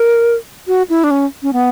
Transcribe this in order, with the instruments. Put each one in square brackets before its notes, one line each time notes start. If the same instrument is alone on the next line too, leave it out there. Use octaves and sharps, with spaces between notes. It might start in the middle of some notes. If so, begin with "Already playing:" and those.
Already playing: [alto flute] A#4
F#4
E4
D4
C#4
C#4
B3